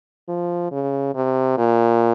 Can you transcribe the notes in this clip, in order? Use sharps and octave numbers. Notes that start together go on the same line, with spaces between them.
F3
C#3
C3
A#2